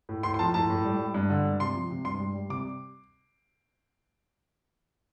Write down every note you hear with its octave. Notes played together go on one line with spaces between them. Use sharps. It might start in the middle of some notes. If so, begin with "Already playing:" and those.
A2
A2 C6
C6
F3 A5
A2 A5
A2
G3
G3
G2
D3
G2
C3 C6
F3
C3
G2 C6
G3
G3
C3 D6